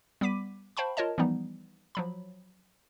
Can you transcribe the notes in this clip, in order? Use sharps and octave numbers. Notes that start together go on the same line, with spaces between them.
G3 B3 B5 D6 B6 D#7
C5 F5 G5 A5 B5 C#6
F4 A#4 C#5 D#5 A5
E3 F3 G3 B3 D#4
F3 F#3 B5